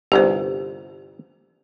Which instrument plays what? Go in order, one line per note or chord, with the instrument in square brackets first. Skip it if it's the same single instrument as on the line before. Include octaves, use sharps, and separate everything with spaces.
[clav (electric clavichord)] G1 C2 [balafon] G4 C5